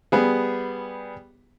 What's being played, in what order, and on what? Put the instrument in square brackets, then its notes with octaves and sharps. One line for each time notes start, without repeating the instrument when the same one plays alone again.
[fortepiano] G3 B3 G#4